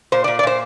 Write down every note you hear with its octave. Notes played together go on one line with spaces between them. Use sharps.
A#2 C5
A#2 D5
D5
A#2 C5